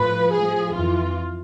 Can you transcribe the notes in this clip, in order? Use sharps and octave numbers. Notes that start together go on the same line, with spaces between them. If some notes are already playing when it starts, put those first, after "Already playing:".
Already playing: A2 F3 B4
A2 F3 G#4
F2 E3 F4